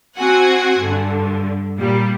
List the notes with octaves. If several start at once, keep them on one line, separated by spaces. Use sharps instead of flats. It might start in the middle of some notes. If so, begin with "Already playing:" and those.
C4 F#4 F#5 G#5
G2 D3
A#2 G3